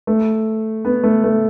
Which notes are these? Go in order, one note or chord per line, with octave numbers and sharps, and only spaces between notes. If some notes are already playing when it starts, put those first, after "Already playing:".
A3
B3
A3
A3